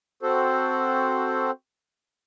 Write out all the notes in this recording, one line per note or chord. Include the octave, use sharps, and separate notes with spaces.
C4 F#4 A4 C5